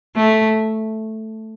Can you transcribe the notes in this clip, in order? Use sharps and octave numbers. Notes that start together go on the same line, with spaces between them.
A3